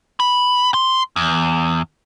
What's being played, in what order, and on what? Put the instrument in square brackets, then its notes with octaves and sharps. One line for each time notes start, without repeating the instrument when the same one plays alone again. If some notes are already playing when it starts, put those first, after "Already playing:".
[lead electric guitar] B5
C6
E2